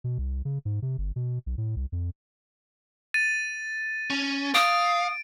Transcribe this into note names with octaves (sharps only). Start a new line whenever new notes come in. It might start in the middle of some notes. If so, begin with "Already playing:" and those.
B2
C2
C#3
G#2
C3
G1
B2
B1
A2
C2
F2
A6 D#7
C#4
F5 D#6 D7